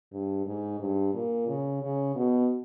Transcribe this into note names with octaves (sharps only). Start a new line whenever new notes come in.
G2
G#2
G2
A#2
C#3
C#3
B2